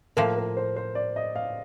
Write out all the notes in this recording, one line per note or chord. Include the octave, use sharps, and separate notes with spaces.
A2 F3 A#3 A#4
A#4
C5
C5
D5
D#5
F5